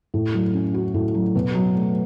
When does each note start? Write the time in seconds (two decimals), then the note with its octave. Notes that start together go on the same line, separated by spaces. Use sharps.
0.14 A2
0.34 F#3
0.54 C#4
0.74 F#4
0.94 A2
1.14 F#3
1.35 B2
1.55 F#3
1.75 A3